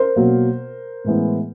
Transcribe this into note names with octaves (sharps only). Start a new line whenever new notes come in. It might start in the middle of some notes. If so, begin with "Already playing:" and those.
Already playing: A#4 C5
B2 F#3 A#3
A2 E3 G#3 B3